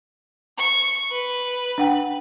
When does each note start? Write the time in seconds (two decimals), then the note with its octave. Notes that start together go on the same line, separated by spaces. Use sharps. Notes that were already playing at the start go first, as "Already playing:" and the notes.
0.58 C#6
1.12 B4
1.78 D4 F#5 G5